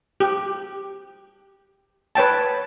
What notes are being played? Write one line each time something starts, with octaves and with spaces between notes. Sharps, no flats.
G4
B4 C#5 G5 A5